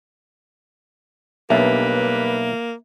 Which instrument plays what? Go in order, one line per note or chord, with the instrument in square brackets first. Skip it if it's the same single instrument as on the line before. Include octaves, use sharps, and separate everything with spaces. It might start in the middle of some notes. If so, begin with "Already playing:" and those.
[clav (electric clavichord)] B1 [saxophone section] G2 B4 [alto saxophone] A#3 [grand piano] E5